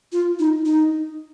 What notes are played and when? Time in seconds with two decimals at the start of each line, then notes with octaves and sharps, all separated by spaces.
0.12 F4
0.39 D#4
0.65 D#4